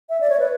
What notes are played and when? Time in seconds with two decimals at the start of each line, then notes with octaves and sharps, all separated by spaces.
0.09 E5
0.21 D5
0.30 C#5
0.39 B4